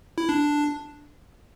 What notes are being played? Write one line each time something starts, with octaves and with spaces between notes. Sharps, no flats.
E4
D4